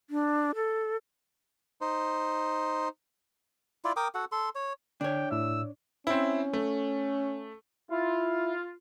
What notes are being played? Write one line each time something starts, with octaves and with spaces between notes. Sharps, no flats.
D4
A4
D#4 C5
E4 F4 D5
A#4 G5 D6 D#6
F#4 A4 F#5
A4 C6
C#5
D3 D4 C#5 G5
A2 E5 E6
C4 C#4 E4
A3
E4 F4